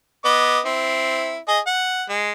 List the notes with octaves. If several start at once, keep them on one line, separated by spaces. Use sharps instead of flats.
B3 D#5 D6
C4 E4
G#4 D#5
F#5
G#3